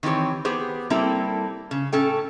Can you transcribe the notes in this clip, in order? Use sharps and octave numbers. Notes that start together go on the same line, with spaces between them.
D#3 E3 C4 G4 C#5
B3 G4 G#4 C5
G3 A#3 C4 E4 A4
C#3
A2 C#4 A4 G5